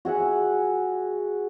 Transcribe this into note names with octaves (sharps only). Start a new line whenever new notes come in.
F#4 G#4 E5 F#5